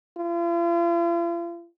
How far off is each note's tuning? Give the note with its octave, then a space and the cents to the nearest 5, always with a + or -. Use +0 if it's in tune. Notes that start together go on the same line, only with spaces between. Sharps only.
F4 -45